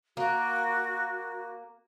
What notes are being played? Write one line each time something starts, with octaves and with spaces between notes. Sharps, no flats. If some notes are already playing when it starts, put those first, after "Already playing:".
A#3 F#4